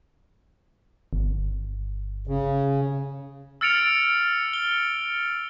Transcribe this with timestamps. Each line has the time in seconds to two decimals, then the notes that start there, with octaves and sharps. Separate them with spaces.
1.13 G1
2.27 C#3
3.61 E6 F6 A6 C#7 D7 F7
4.53 G7